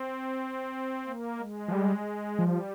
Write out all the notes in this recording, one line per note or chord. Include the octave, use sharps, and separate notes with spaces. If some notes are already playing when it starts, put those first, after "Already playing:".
Already playing: C4
A#3
G#3
F3
G3
F3 G3